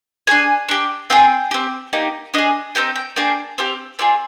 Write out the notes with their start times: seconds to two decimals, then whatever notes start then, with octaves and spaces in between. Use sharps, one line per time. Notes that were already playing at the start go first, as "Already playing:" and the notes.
0.27 D4 G#4 G#5
0.69 D4 G4
1.10 C4 F4 G#4 G5
1.51 C4 G4
1.93 A#3 D#4 G4
2.34 D4 G#4 D#5
2.75 C4 D#4 G4 G5
2.96 G5
3.16 A#3 D4 G#4 G5
3.58 C4 G4 F5
3.99 C4 F4 G#4 D5